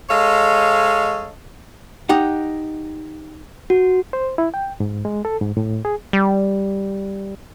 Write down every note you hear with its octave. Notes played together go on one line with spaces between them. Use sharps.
G#3 A4 C#5 D#5 F5
D#4 G4 F#5
F#4
C5
E4
G5
G#2
G#3
A4
G#2
A2
G#4
G3